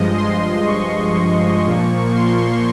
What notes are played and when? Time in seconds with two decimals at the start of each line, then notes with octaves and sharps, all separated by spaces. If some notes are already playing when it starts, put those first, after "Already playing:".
Already playing: G2 F3 G#3 D#5
0.17 C6
0.67 C#6
1.17 C#6
1.66 A#2 F3 A#3
2.16 C6